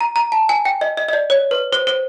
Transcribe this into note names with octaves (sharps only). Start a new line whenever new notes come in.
A#5
A#5
A5
G#5
G5
D#5
D#5
D#5
D5
C#5
B4
C5
C5